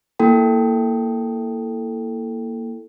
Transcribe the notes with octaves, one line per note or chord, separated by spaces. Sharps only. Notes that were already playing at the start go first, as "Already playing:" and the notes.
A#3 E4 A4 G5